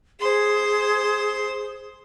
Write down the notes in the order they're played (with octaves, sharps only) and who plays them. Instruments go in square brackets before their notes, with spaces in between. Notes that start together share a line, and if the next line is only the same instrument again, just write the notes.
[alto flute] G#4 [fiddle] C5 C6